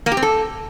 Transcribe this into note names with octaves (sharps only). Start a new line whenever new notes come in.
A#3
G4
C4
A4